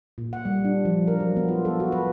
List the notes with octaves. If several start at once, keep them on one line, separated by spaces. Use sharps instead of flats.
A#2
F#5
G3
D4
F3
A#4
F#3
B3
F4
A4
F#4
B4